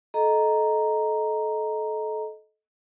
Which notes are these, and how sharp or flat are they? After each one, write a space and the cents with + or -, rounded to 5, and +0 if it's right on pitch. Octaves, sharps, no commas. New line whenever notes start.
A4 -25 D#5 +0 A#5 +0